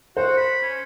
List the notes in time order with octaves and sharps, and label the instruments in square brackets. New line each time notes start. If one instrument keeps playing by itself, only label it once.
[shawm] F#4 [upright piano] C5
[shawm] B5
C#4